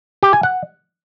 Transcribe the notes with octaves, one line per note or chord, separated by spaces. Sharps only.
G4
G#5
F#5